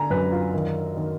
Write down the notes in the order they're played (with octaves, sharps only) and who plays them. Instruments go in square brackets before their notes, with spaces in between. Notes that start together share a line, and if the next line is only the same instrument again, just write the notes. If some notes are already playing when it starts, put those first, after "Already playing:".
Already playing: [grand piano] D3 G#5 A#5
F#2 B4
F4
D#3
D#3